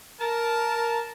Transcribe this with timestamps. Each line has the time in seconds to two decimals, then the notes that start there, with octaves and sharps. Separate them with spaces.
0.20 A#4 A5